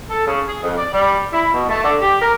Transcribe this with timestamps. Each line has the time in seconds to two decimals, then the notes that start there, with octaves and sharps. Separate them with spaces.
0.10 A4
0.26 C#3
0.48 G#4
0.63 F2
0.78 D5
0.92 G3
1.33 E4
1.53 B2
1.69 A3
1.84 D3
2.01 G4
2.21 A#4